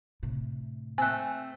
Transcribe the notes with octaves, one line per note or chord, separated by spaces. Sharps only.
A2 C3
A3 C4 G#5 F#6